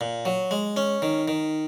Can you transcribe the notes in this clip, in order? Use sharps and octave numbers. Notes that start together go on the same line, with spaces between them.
A#2
F#3
G#3
C#4
D#3
D#3